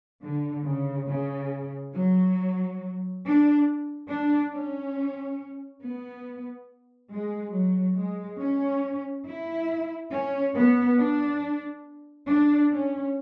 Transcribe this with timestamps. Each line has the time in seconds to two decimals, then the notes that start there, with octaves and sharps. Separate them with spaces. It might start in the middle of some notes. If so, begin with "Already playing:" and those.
0.23 D3
0.65 C#3
1.08 C#3
1.94 F#3
3.24 D4
4.09 D4
4.53 C#4
5.82 B3
7.11 G#3
7.53 F#3
7.96 G#3
8.39 C#4
9.26 E4
10.11 C#4
10.55 B3
10.98 D4
12.27 D4
12.71 C#4